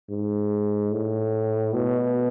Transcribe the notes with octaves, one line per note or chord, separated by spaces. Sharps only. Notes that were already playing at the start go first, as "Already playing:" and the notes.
G#2
A2
B2